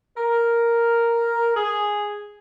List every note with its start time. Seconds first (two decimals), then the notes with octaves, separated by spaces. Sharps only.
0.18 A#4
1.56 G#4